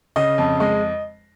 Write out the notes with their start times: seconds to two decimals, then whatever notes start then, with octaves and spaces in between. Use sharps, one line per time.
0.16 C#3 D#5
0.38 F2
0.60 G#3 D#5